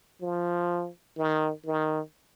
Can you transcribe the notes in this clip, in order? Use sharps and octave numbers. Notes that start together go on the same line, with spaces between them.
F3
D#3
D#3